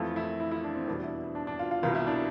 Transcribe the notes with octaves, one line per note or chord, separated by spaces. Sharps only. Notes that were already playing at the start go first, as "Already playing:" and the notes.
Already playing: F2 E3 A3 F4
E4
E4
E4
D4
C4
E2 B2 G3 D4
E4
D4
D4
F4
F4
C2 B2 G3 F4
E4
D4